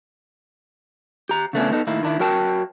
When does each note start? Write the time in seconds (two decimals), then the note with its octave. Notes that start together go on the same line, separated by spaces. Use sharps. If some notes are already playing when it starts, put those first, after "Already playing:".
1.29 G4 A#5
1.53 C#3 E3 A3 B3 C#4 D4
1.71 B3 D#4 A4
1.87 A2 D#3 A#3 E4
2.03 D#3 D4 E4
2.19 F#3 F#4 A#4 G5 A5